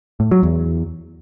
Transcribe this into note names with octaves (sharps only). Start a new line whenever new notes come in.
A2
F#3
E2